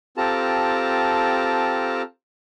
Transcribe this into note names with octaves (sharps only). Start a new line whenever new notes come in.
C4 F4 G4 A4 A5 A#5